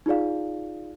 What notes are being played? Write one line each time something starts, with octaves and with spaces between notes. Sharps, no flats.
D#4 F4 G#4 D5 F5